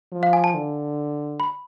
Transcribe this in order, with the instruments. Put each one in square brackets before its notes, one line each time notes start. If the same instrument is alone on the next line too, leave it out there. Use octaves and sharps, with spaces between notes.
[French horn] F3
[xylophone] F5
G#5
A5
[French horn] D3
[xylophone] B5